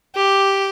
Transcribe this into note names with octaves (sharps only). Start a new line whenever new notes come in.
G4